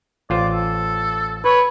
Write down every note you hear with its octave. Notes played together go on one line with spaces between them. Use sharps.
A1 F4 C5 D5
A4
B4 C#5